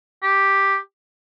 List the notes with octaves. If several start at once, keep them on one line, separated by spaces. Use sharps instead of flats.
G4